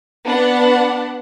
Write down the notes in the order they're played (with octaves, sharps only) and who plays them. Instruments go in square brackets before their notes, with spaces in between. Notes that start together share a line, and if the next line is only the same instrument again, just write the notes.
[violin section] B3 D4 F#5